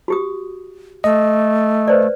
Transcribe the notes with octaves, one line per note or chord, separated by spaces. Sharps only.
F#4 G4 D#6
A3 D#5
B4 C5 D5